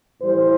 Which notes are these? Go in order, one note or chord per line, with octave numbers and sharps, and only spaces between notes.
A2 E3 G3 C5